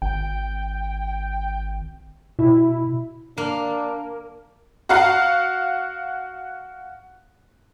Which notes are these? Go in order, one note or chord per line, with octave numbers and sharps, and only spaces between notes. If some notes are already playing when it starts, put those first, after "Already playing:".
G#1 G5
B2 E4
A#3 D4
F#4 F5 F#5